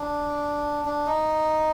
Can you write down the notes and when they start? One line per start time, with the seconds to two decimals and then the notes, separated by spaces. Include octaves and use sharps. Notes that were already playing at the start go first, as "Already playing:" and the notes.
Already playing: D4
0.85 D4
1.06 D#4